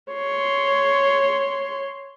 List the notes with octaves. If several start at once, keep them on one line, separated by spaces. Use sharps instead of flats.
C#5 C6